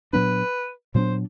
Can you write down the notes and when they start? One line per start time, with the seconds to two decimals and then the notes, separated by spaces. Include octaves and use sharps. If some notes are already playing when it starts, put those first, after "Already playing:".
0.13 A#2 F#3 B3 D4 B4
0.95 A#2 F#3 B3 D4 C5